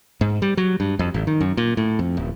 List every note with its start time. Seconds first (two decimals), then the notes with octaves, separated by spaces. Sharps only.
0.21 G#2
0.42 G3
0.57 F#3
0.80 G2
0.99 F2
1.14 G#1
1.27 D#3
1.41 F#2
1.57 A#2
1.77 A2
1.99 F2
2.17 D#1